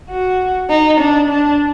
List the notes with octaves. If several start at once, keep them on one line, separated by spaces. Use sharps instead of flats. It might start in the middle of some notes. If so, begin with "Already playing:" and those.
F#4
D#4
D4
D4